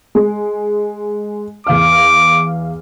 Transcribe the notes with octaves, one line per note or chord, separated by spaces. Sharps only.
G#3
E2 F5 D6 F6